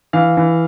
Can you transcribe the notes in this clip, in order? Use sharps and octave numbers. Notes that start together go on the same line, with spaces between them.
E3 F5
E3